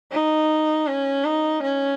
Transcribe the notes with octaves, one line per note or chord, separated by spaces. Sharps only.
D#4
C#4
D#4
C#4